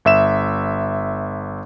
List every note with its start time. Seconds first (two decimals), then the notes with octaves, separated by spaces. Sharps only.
0.05 G1 E5 E7